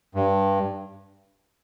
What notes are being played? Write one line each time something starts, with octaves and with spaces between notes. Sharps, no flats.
G2